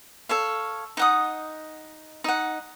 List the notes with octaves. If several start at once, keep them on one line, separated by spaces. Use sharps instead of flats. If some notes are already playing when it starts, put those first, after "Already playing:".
A4 C#5 F5
D#4 F#5 D#6
D#4 F#5